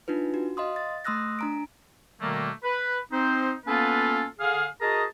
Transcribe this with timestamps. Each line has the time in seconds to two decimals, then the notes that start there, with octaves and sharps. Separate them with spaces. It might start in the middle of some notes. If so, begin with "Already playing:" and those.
0.08 D4 D#4 F4 B4
0.34 F#4
0.57 D#5 F5 C6 D#6
0.76 A6
1.05 A3 C6 D#6 E6 F#6 A#6
1.39 D4 A#5 D7
2.21 B2 D#3 G3 A3 A#3
2.63 B4
3.12 C4 D#4 C5
3.67 A#3 B3 C#4 F4 A4 B4
4.40 D3 G#4 F5
4.82 F#4 G#4 A#4 D#5 A5 A#5